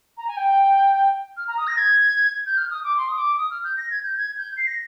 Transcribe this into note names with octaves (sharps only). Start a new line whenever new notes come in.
A#5
G#5
G5
F6
A#5
D#6
A#6
G#6
G6
F6
D#6
D6
C6
D#6
D6
D#6
F6
G6
A#6
G#6
G6
G#6
G6
C7
A#6